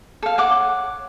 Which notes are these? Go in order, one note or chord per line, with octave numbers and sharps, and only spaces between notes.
A4 F5
C#5 F#5 D6